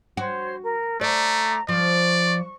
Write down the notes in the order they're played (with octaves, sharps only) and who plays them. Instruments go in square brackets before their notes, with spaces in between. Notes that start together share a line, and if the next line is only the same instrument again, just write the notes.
[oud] F#4 [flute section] C5 C#5
[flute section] A#4
[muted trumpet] A3 [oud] D5 [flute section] A#5 D6
[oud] F3 [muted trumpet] D5 [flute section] C#6